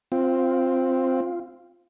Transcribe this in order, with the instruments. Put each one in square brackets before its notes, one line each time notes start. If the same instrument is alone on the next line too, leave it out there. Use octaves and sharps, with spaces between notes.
[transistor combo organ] C4 [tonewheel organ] F4